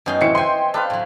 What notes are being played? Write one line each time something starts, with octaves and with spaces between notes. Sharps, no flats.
F#2 B2 C#4 D#4 G5 C6
A2 E3 C4 E5 C#7
D#5 G5 G#5 C6
D4 A4 B4 F5
A2 F#3